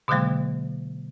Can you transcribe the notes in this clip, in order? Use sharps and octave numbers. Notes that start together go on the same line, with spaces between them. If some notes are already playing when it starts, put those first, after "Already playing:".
B2 D3 D#3 F#3 G#3 A#3